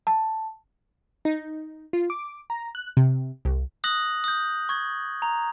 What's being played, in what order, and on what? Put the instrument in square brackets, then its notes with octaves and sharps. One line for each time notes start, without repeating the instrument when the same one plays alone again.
[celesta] A5
[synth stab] D#4
F4
D6
A#5
F#6
C3
C2
[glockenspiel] D#6 F#6 A#6 F#7
D#6 G6
C#6 G#6 G7
A#5